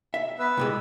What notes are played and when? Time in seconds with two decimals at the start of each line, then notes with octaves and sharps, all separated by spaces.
0.14 E5
0.39 B3 B4 E6
0.57 C2 A#2 G#3